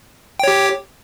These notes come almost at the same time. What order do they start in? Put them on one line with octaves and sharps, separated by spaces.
G5 C#5 G4